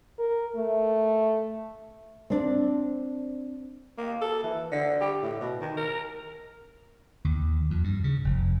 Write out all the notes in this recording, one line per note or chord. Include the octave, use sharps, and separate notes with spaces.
A#4
A3
C4 D4
A#3
A4
E3
D3
G4
A2
B2
D#3
A#4
D#2
F2
G2
C#3
F1